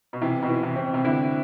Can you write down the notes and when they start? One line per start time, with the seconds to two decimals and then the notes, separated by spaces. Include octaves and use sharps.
0.13 B2
0.21 C3 E3
0.42 B2
0.49 E3
0.63 C3
0.76 C4
0.94 C3
1.05 D3 E4